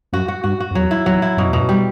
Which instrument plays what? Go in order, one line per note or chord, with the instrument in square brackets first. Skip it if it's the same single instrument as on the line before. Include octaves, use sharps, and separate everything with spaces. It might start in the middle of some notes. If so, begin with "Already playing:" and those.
[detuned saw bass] F#2 [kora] F#4
[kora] F#4
[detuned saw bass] G2 [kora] F#4
[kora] F#4
[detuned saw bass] F#2
[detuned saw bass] E2 [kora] F#3
[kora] E4
[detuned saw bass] E2 [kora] F#3
[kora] E4
[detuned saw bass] F#2 [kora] B2
[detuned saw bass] E2 [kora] B2
[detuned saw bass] F#2
[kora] G3